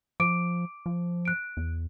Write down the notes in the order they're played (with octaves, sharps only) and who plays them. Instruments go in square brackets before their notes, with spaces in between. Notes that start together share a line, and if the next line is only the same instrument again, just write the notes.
[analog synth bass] F3 [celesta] D6 D7
[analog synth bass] F3
[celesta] F#6 D7
[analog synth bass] E2